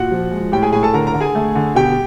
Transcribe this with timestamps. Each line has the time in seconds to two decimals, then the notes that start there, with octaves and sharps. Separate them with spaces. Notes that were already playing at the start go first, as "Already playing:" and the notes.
Already playing: A#2 F#4 F#5
0.11 F3
0.31 G#3
0.52 A2 G4 G5
0.62 G#4 G#5
0.72 A2 G#4 G#5
0.83 A4 A5
0.93 D3 A#4 A#5
1.07 A#4 A#5
1.14 D3
1.20 G#4 G#5
1.35 A3
1.55 D3
1.75 B2 G4 G5